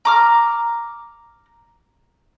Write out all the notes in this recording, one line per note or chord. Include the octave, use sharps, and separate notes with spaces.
A#5 D6 F6